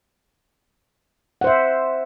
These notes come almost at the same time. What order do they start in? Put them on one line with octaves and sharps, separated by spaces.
F#5 C5 E5